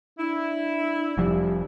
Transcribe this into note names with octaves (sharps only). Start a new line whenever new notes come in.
D4 E4
F1 F2 F3 G3